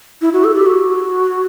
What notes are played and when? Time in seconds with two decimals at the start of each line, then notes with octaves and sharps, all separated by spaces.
0.21 E4
0.33 F#4
0.44 A4
0.55 G4
0.66 F#4